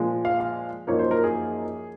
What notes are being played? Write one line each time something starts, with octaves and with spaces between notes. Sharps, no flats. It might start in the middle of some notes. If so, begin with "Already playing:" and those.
Already playing: A#2 F3 G#3
F5
F5
F#2 F3 A#3 D#4 C#5
C5
A#4
G#4